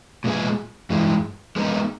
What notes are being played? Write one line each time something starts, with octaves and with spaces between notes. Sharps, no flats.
A#2 G#3 B3 D#4 G#4
G2 E3 G#3
G#3 B3 D#4 A#4